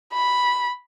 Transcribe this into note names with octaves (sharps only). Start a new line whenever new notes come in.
B5